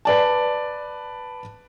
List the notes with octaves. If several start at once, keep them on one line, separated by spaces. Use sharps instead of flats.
B4 D5 A5